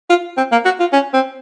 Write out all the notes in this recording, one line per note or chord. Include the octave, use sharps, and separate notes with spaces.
F4
C4
A#3
F#4
F4
C#4
C4